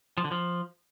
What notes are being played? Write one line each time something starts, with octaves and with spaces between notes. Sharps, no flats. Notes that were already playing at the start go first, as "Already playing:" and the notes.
F3
D3
F3